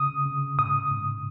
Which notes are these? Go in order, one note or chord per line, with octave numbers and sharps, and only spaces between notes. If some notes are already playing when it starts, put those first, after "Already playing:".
Already playing: C#3 D#6
C#3
G#2 D#6
G#2